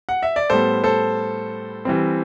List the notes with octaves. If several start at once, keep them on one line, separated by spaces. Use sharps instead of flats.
F#5
E5
D5
A2 G3 B3 A4 C5
A4 C5
E3 G3 C4